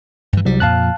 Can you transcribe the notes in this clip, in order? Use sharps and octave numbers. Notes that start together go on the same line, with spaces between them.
G2 E3
C2 F#3 G3
F2 A#2 F3 F5 A5 F#6